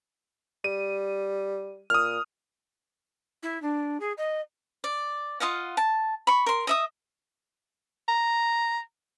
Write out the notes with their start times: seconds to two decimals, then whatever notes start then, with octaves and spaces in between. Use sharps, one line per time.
0.64 G3 D#7
1.90 A#2 D#6 F6
3.42 E4
3.62 D4
4.00 G#4
4.17 D#5
4.84 D5
5.40 F4 D#5 F5 F#5
5.77 A5
6.27 B5 C#6
6.46 A#4 C6
6.67 D#5 E5 D#6
8.08 A#5